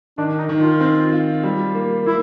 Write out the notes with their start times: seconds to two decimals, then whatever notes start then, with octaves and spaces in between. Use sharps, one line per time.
0.18 D#3 D4
0.38 D#4
0.49 D#3
0.60 F4
0.80 C4
1.12 F4
1.44 G3
1.75 A#3
2.06 A#3 E4